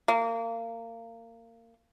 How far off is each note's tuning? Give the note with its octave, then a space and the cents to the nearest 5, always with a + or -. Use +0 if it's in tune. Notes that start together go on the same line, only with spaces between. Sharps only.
A#3 -25